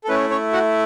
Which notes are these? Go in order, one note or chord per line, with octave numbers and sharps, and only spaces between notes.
A4
A3 C#4 E4 B4
C#4 C#5
F#4 F#5